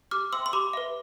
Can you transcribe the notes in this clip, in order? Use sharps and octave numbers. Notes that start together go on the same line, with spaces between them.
G4 D6 F6
C5 E5 G5 C6 E6
C6
G4 B5 D6
B4 E5